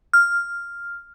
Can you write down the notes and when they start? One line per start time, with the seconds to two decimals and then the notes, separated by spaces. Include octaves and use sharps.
0.13 F6